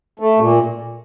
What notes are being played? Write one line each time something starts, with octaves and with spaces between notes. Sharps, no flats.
A3
A#2